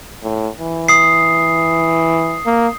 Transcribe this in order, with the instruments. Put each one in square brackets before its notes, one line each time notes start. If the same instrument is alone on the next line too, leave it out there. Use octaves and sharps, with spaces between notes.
[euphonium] A2
E3
[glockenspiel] D#6 C7
[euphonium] A#3